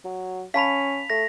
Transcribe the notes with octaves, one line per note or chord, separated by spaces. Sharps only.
F#3
C#4 F5 A5 B5 B6 F7
A3 A#6